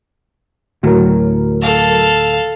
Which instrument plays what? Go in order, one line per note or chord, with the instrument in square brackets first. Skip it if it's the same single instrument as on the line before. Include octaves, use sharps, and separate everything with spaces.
[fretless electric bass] D2 A2 [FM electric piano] F#3 A#4
[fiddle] A4 F5